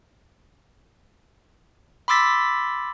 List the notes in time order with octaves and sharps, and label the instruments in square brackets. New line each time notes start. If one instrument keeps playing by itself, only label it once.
[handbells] B5 C6 D6 E6 A6 B6